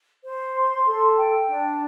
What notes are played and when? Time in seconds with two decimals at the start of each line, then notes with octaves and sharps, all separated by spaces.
0.25 C5
0.55 C6
0.86 A4
1.17 G5
1.47 D4